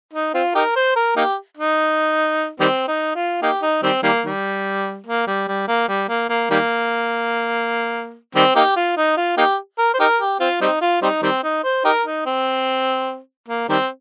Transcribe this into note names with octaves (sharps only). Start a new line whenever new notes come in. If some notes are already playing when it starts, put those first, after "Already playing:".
D#4
C4 F4
D#4 G4 A#4
C5
A#4
A#3 D#4 G4
D#4
D#3 G3 C4
D#4
F4
A#3 D#4 G4
D#4
D#3 G3 C4
D#3 G3 A#3
D#3 G3
A#3
G3
G3
A#3
G3
A#3
A#3
D#3 G3 A#3
D#3 G3 C4
A#3 D#4 G4
F4
D#4
F4
A#3 D#4 G4
A#4
C5
D#4 G4 A#4
G4
C4 F4
G3 C4 D#4
F4
G3 C4 D#4
D#3 G3 C4
D#4
C5
D#4 G4 A#4
D#4
C4
A#3
D#3 G3 C4